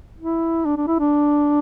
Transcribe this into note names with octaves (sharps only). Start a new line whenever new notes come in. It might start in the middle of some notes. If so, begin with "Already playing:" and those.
E4
D4
D4
E4
D4